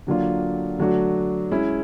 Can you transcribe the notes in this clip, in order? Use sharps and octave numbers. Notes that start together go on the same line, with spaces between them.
D3 F#3 A#3 D4 F4
D3 F#3 A3 D4 F#4
G#3 C#4 E4